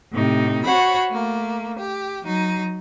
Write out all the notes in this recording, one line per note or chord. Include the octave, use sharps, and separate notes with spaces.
A2 C3 D#4
F#4 C5 C#5 F#5 B5
A3 A#3
G4
F#3 D#4